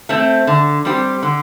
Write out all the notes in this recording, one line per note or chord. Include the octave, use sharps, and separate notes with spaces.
A3 C4
D3
G3 C4 G4
D3